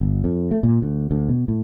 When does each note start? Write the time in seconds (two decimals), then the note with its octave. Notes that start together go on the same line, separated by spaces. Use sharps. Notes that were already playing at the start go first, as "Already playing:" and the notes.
0.01 G1
0.24 F2
0.51 A3
0.63 A#2
0.82 D2
1.11 D2
1.29 B2
1.48 A2